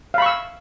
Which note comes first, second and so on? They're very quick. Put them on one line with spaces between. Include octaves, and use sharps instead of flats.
F5 B5 C#6 E6